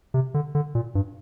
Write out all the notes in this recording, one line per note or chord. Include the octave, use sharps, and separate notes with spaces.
C3
D3
D3
A#2
G2